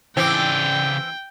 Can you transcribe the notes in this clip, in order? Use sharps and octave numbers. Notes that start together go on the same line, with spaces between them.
C#3 E3 C4 D5 G5